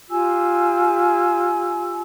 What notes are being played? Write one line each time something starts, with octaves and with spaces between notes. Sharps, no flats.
F4 G4 G#5 E6